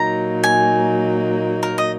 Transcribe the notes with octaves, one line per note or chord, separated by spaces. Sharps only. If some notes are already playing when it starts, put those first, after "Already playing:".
Already playing: A#2 F#3 A#3 D#4 A#5
G#5
A#4
D#5